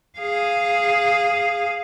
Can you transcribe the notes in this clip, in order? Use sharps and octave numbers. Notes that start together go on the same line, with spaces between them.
G#4 F5